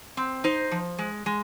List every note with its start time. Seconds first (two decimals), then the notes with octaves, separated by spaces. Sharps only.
0.17 C4
0.44 D#4 C5
0.71 F3
0.99 G#3
1.26 G#3